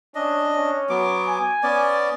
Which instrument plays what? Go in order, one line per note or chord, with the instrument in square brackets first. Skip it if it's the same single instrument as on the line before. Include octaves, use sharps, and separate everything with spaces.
[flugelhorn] C#4 [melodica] D4 D#5
[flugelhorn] C#4
[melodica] F#3 B3 D6
[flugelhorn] G#5
[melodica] B3 C#4 D5